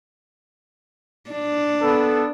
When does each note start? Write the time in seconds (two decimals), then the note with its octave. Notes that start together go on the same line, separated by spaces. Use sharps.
1.31 D4
1.81 B3 A4